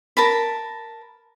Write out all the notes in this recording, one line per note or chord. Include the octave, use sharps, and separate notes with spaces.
A#4 A5 B5